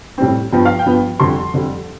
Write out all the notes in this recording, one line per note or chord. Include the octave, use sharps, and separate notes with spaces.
A2 G3 C4
G2 F3 B3 G5
F5
G5
G2 F3 B3
F2 D3 G3 C6
F2 D3 G3